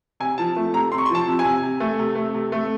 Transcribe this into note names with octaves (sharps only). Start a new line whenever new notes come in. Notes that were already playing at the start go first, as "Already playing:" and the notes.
C3 G#5
F3 A5
A3
C3 A#5
C3 C6
C#6
C6
F3 A5
C3
G#5
C3
C3
A3
C3
A3
C3
A3